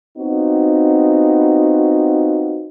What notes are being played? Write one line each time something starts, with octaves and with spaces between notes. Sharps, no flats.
B3 C4 D#4 F4 F#4